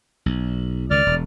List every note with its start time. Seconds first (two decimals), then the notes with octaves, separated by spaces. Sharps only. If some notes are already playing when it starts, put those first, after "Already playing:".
0.26 B1
0.91 C#2 D#3 D5 F6
1.06 E1